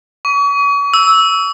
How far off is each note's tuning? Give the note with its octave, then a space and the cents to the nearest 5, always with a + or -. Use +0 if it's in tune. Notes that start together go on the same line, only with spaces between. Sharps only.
C#6 +40
E6 -10